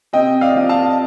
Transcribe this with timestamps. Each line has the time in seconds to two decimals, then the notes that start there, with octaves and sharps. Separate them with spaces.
0.13 C3 D#5 G5
0.41 D5 F5
0.56 F3
0.69 F5 A5